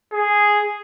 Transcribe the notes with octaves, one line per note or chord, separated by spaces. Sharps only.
G#4